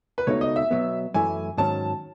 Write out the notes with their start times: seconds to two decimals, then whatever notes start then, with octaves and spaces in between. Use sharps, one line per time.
0.18 B4
0.27 C#2 B2 A3 D#4 C#5
0.41 D#5
0.56 E5
0.71 B2 F#3 B3
1.14 F#2 E3 A3 E4 G#5
1.57 G#2 D#3 F#3 C#4 A5